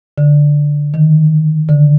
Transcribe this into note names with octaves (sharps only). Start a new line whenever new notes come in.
D3
D#3
D3